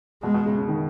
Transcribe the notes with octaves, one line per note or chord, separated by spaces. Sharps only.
B2 G#3
B2
C#3
C#3
D#3